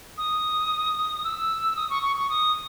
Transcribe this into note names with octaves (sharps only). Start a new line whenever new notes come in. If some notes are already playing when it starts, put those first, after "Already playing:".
D#6
E6
D#6
C#6
C#6
C#6
D#6